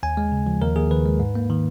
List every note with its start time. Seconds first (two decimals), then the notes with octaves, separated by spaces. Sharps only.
0.03 D#2 G#5
0.17 G#3
0.32 C#3
0.47 F3
0.62 D#2 A#4
0.76 D#2 G#4
0.90 D#3 B4
1.05 G#3
1.20 G#2
1.35 A#3
1.50 D#3